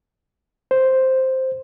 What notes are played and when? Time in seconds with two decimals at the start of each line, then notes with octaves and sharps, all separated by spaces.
0.71 C5